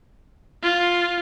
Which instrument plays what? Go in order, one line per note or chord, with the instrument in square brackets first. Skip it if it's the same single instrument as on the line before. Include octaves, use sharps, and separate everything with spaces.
[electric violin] F4